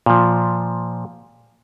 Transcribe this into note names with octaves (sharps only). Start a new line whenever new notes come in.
A#2 F3